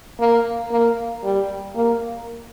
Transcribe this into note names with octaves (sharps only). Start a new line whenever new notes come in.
A#3
A#3
G3
A#3